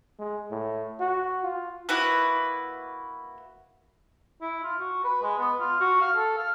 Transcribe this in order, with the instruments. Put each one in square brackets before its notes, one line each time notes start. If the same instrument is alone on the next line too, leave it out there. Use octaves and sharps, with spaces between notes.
[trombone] G#3
A2
F#4
F4
[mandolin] A#3 E4 F#4 B4
[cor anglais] E4
F4
F#4
B4
G#3
B3
F4
F#4
F5
A4
F5